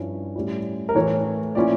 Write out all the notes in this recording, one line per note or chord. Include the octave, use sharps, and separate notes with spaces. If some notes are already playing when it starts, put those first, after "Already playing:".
Already playing: G2 F3 C#4 E4 C#5
A2 G3 C#4 E4
A#4
A2 E3 A3 C#5
A#2 F3 C#4 E4 D5